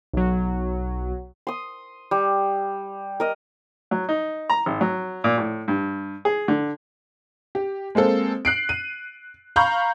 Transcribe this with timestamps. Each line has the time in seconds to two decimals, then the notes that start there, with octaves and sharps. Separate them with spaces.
0.13 B1 F#3
1.47 C6 D#6
2.11 G3
3.20 A#4 D#5
3.91 F#3
4.09 D#4
4.50 A#5
4.66 G#1
4.81 F#3
5.24 A#2
5.38 A2
5.68 G2
6.25 G#4
6.48 D3
7.55 G4
7.95 G#3 A#3 C4 A4
8.45 F#6 C7 D7
8.69 D#7
9.56 F5 A#5 B5 C#6 G6